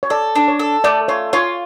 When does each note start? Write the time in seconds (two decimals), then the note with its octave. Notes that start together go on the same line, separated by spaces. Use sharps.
0.03 C#5
0.10 A4 D5
0.36 D4
0.48 C#5
0.60 A4
0.84 A3 D5
1.08 F4 C#5
1.33 F4 C#5